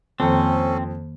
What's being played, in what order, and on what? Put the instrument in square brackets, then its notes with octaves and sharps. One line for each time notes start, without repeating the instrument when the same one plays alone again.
[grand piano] F2 [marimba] D#3 A#3 [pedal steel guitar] C4 [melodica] C#4 A4